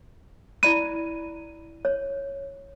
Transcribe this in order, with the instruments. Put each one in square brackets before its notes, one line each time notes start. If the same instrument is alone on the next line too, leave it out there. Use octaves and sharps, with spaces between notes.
[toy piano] E4 D5 B5 [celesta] D#7
[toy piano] C#5